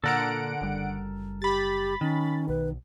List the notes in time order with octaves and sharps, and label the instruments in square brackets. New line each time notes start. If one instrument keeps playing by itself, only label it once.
[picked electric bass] A#2 [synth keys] D3 F#5 D7 [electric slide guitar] A4 A#4
[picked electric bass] F#1 G3
[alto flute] G4 [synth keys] B5 A6
[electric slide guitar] D#3 [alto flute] C#4
[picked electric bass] B1 [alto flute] B4